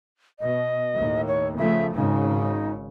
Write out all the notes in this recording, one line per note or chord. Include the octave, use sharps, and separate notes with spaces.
B2 D#5
D#2 A2
C#5
C#3 F3 A3 E5
G#1 G#2 C#3 D#4
D#4